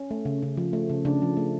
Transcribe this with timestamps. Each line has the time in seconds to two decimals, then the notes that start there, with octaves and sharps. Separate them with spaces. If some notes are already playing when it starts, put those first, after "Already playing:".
Already playing: C#4
0.11 A3
0.25 C#3
0.42 C#3
0.57 F3
0.73 A3
0.89 C#3
1.05 C#3 D4
1.22 F3
1.37 A3